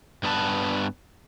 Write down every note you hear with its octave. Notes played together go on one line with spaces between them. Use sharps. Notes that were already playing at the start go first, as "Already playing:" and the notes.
G2 B3 B4 A5